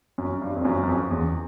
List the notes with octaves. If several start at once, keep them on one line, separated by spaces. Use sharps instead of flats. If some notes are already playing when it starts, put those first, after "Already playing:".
F#2
G2
F2
F#2
F#2
F2
E2